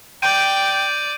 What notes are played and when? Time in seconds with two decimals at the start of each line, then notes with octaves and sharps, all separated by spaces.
0.22 D5 G5 G6 D7 D#7